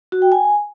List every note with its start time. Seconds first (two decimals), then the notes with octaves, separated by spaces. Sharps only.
0.12 F#4
0.22 G5
0.32 G#5